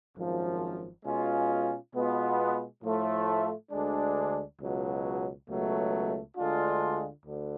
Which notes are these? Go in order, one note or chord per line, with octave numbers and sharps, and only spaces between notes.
G#1 F#2 F3
B2 G#3 C#4 F4
B2 G#3 B3 F4
A2 F3 A3 F4
D2 D3 G#3 D4
C#2 B2 F#3
C#2 B2 F#3 A3
D2 D3 G#3 D4 F4
D2 D3